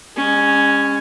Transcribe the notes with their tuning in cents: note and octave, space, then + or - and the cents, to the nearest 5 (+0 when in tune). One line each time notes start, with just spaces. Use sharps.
G#3 -40 C#4 +0